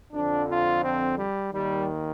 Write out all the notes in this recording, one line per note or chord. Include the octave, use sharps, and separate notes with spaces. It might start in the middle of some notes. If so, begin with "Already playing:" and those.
F2 D3 F3 D4
F4
C4
G3
D#2 D#3 G3